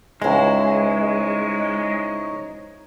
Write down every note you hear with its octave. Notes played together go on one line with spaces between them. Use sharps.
C#2 G#3 D#4 E4 C5 C#5 A#5